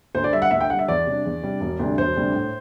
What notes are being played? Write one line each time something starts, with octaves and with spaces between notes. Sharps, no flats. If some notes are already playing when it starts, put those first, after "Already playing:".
D2 C5
D5
D3 G3 E5
F#5
D2 E5
G5
D3 G3 F#5
E5
E2 D5
C3 G3 D4
E2
C3 G3 D4
E1
D2 C3 G3 D4
E1 C5
D2 C3 G3 D4
A2